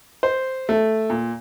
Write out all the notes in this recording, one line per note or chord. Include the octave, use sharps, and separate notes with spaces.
C5
A3
A#2